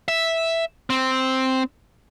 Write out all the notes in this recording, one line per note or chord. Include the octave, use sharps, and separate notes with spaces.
E5
C4